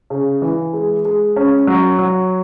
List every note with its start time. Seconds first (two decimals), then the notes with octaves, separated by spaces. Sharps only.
0.10 C#3
0.42 E3
0.73 G#3
1.05 G#3
1.36 C#4
1.67 F#3
1.99 F#3